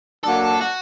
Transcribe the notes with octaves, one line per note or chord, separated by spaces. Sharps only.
F#3 A#3 D4 A4
F#4